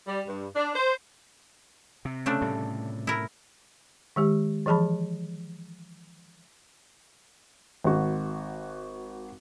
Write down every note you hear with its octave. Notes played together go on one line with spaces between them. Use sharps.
G3
G2
D4
C5
C3
C#3 A3 D4
A2 C3 G3
E4 A#4
D#3 G#3 G4
E3 F3 G#4 A5 B5
G#1 F#4